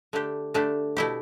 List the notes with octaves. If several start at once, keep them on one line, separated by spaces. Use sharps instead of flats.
D3 A3 D4 G4
D3 A3 D4 G4
B2 A3 E4 G4